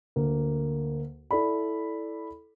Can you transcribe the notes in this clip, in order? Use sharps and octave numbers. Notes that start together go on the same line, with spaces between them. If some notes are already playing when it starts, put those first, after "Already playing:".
D2 A#3
E4 A4 D5 B5